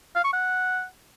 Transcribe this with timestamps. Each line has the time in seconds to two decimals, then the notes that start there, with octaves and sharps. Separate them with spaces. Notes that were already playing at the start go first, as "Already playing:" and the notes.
0.15 F5
0.24 C#6
0.33 F#5